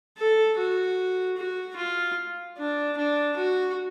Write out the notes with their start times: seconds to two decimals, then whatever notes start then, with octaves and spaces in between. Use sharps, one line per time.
0.18 A4
0.58 F#4
1.37 F#4
1.77 F4
2.58 D4
2.97 D4
3.37 F#4